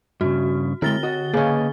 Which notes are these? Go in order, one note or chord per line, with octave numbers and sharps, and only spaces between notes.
G2 C#3 F#4
D3 G#3 E4 A#4 A6 G7
F#4 D#5
C#3 A#3 C#4 B4 D#5